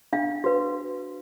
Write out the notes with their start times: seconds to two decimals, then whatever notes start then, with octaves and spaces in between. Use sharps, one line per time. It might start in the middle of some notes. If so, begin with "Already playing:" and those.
0.13 D4 F5
0.44 F#4 B4